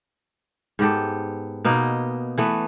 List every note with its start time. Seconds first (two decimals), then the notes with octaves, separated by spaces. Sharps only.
0.79 G#2 B3 G4 A4
1.65 B2 A#3 B3 D#4
2.38 E3 A3 B3